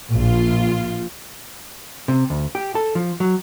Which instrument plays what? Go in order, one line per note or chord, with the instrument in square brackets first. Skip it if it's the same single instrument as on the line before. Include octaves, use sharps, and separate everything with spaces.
[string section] A#1 F4
[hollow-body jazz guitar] C3
D2
G4
A4
F3
F#3